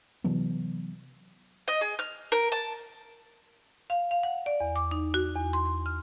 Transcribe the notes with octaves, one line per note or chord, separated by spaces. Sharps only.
C3 E3 F#3 B3
D#5
G#4
F6
A#4
A5
F5
F5
F#5
D5
E2
D6
D#4
F#4
E2
C6
C6
F6